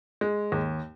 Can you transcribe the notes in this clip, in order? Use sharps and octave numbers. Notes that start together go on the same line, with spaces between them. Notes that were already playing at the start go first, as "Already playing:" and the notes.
G#3
D#2